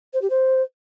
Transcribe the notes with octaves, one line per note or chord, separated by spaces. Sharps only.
C5
G4
C5